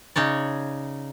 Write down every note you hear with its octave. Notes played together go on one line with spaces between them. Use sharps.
C#3 D#4 C#5 D5